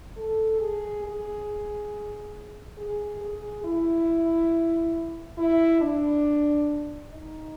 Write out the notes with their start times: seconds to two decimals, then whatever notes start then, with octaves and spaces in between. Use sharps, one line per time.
0.17 A4
0.60 G#4
1.04 G#4
2.78 G#4
3.21 G#4
3.64 E4
5.37 E4
5.81 D4
7.11 D#4